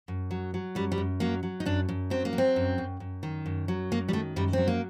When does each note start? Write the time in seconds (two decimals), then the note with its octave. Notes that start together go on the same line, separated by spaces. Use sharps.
0.08 F#2
0.31 F#3
0.54 F#3
0.75 F#2 G3
0.92 G3
0.98 F#2
1.20 F#3 A#3
1.43 F#3
1.60 D#4
1.66 F#2 D4
1.89 F#2
2.10 F#3 C4
2.25 A#3
2.33 F#3
2.38 C4
2.56 F#2
2.78 F#2
3.00 F#2
3.23 D#3
3.46 F#2
3.68 F#3
3.91 F#2 A#3
4.09 G3
4.13 D#3 A3
4.36 F#2 G3
4.53 F#3 C4
4.68 A#3